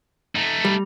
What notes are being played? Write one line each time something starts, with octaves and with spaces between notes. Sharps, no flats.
A3 D#4
G3